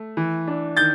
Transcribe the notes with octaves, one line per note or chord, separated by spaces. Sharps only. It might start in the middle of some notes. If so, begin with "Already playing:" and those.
Already playing: A3
E3
D4
D#3 G6 A6